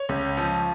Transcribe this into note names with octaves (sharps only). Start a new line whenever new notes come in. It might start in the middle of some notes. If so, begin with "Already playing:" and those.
Already playing: C#5
C#2
F3